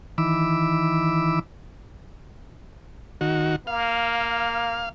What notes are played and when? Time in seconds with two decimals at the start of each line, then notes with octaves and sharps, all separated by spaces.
0.18 D#3 E3 B5 D6 E6
3.21 D#3 F#4
3.67 A#3 F5